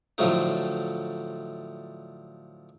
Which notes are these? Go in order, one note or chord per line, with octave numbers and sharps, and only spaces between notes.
A2 D3 F3 F#3 A3 D#4